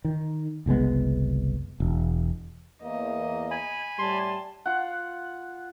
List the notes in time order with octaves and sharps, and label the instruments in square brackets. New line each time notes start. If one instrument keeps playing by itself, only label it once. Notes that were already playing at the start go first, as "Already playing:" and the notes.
[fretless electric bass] D#3
F#1 C2 G#3 B3
E1
[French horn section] E2 A#3 [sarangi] D#5
[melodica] G#5 B5
[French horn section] A2 G3 [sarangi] A5 [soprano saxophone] C6
[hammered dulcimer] F4 F#5